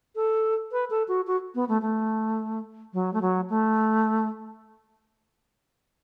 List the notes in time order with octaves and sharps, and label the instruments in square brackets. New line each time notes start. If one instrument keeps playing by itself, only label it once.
[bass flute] A4
B4
A4
F#4
F#4
B3
A3
A3
F#3
A3
F#3
A3